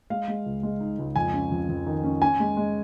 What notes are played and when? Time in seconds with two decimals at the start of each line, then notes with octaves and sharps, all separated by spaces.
0.10 G#3 F5
0.28 G#3
0.46 C#2
0.63 G#3
0.80 D#4
0.98 C#2
1.16 F2 G#5
1.33 C#4
1.51 F2
1.69 F2
1.86 D#3
2.04 C#4
2.22 C#4 G#5
2.40 G#3
2.57 G#3